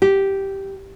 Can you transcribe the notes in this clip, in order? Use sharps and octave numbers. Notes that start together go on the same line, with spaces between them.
G4